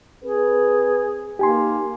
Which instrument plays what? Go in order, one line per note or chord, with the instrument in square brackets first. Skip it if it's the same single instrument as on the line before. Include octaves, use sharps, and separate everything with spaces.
[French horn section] C4 B4 [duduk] G#4
[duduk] A#3 [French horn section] D#4 [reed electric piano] G4 G#5 C6